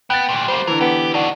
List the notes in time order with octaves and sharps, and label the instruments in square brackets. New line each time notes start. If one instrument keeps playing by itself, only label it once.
[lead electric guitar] B3 [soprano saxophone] G5 [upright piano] F#6 A6
[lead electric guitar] D2 A#2
[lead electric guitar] G3 A#3 [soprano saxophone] C5
[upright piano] D3 E3 [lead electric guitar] A#4
[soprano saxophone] B3 [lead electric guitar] G4
[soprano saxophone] D4 [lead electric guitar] D#4 F#4